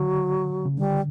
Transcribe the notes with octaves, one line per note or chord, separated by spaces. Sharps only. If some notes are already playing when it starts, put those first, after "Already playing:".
Already playing: D3 F#3
C#3
D3 G3